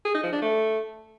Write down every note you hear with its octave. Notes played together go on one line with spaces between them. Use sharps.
G#4
D#4
F3
D4
A3